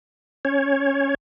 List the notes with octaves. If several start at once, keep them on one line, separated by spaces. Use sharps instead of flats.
C#4 C#5